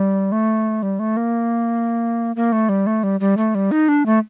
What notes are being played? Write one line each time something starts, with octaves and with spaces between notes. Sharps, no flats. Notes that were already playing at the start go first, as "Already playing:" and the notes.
Already playing: G3
A3
G3
A3
A#3
A#3
A3
G3
A3
G3
G3
A3
G3
D#4
D4
A3